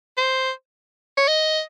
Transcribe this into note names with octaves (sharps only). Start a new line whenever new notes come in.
C5
C#5
D#5